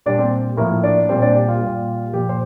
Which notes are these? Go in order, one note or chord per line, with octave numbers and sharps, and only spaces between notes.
A#2 G3 D4 D5
C4 C5
A2 F3 A#3 A#4
D4 D5
A#2 G3 C4 C5
D4 D5
G4
F4
A#2 G3
A#2 F3 G4
C5